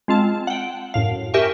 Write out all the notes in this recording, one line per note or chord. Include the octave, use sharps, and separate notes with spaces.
G#3 C4 F4 A5
F#5 G5
F#2 A2 F5
G4 A#4 E5 G5 G#5 C#6